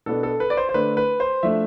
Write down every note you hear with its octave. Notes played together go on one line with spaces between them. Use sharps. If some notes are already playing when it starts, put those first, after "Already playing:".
B2 B3 D4 A4
A4
B4
D5
C5
C5
D3 A3 D4 B4
B4
C5
F3 A3 D4 E5